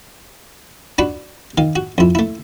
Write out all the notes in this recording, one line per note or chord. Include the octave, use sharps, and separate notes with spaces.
D4 F#4 B5 C#6
D#3 F5
F#4
F2 E4
A3 E4